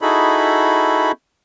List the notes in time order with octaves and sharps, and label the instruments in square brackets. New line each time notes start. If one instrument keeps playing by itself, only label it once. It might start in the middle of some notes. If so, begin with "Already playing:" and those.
[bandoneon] D#4 E4 F#4 G#4 A4 B5